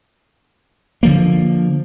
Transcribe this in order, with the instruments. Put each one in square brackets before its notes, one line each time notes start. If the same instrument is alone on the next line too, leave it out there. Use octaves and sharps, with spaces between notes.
[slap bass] D3 F3 A#3